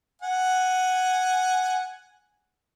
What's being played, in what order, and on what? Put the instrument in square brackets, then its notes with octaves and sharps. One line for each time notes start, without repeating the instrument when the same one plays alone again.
[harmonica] F#5 G#5